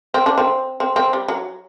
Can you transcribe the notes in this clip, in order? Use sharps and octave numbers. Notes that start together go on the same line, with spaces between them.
C4
D4
C4
C4
C4
G3
F#3